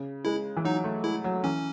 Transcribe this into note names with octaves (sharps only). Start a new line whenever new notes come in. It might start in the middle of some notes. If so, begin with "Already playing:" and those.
Already playing: C#3
G#3 E4
E3
F#3 D#4
A3
G#3 E4
F#3
E3 C#4